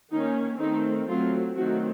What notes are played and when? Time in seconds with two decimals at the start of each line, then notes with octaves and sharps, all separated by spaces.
0.11 D#3 A#3 C#4 D#4
0.59 D#3 A3 C4 D#4
1.08 F#3 A3 C4 F4
1.56 D#3 F#3 A3 C4 F#4